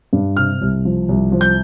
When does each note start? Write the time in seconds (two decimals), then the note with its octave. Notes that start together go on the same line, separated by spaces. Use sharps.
0.13 G2
0.37 C3 F6
0.61 C2
0.85 F3
1.09 C2
1.32 F3
1.41 G6